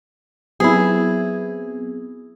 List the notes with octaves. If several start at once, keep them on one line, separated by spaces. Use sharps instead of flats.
F#3 B3 C4 E4 G#4